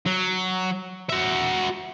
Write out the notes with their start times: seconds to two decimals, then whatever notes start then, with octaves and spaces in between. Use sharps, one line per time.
0.06 F#3
1.10 F#4 E5